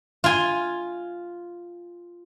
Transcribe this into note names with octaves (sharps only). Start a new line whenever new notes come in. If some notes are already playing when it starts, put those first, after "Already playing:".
F4 G#5